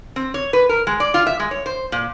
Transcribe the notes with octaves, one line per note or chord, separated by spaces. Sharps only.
C4
C#5
B4
A#4
G#3
D5
F4
E5
G#3
C#5
C5
A#2